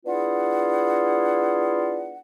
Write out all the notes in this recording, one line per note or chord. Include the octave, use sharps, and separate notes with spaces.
B3 D4 E4 F4 G#4 F#5